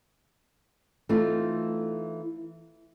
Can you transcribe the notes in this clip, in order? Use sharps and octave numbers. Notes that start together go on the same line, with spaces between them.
E3 A3 C4 D#4 F4